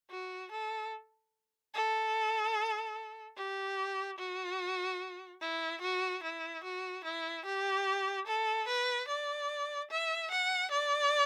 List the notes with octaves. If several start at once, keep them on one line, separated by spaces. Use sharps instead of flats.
F#4
A4
A4
G4
F#4
E4
F#4
E4
F#4
E4
G4
A4
B4
D5
E5
F#5
D5